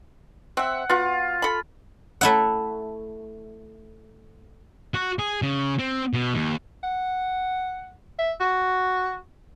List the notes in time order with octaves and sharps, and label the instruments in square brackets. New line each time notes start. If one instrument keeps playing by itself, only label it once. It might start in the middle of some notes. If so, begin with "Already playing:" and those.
[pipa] C4 E5 [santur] F#5
[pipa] B3 F#4 [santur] F4
[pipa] A4 B5
[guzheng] A3 E4 F#5
[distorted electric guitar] F#4
G#4
C#3
C4
B2
D#2
[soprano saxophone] F#5
E5
F#4